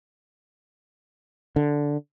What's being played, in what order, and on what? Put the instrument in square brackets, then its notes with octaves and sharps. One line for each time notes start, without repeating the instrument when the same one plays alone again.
[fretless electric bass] D3